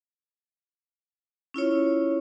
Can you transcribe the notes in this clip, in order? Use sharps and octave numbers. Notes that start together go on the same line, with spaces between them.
C#4 E4 F4 C#5